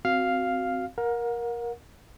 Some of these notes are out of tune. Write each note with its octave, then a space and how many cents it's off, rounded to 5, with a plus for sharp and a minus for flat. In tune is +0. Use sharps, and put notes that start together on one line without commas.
C4 +0 F#4 +0 F5 +0
A#4 +15 F#5 -40